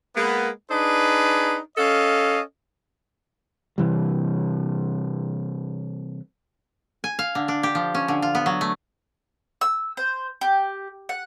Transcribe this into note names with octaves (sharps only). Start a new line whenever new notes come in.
G#3 A#3 B3
D4 D#4 G#4 B4
C#4 A4 D#5 F5
C3 E3 G3
G#5
F5
D3
D4
G4
F3
C#4
D3
F4
B3
F#3
A3
E6
C5
G4
F#5